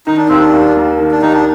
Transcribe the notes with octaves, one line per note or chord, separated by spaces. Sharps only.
D#3 D#4
D4
D#2 C4
D4
D#2
A#3
D#3
D4
D#2 D#4
D4